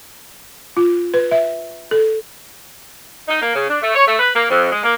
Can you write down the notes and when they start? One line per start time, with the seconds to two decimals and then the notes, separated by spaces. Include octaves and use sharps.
0.77 F4
1.14 B4
1.31 E5
1.91 A4
3.28 D#4
3.42 A#3
3.55 C#3
3.69 D4
3.82 A3
3.95 C#5
4.07 A3
4.19 B4
4.35 A#3
4.49 F2
4.72 G#3
4.84 A#3